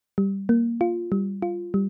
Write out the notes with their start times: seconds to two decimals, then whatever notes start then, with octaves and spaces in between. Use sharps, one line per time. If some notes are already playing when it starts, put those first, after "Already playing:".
0.18 G3
0.49 A#3
0.81 F4
1.12 G3
1.42 F4
1.74 G3